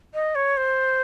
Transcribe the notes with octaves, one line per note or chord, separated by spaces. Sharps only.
D#5
C#5
C5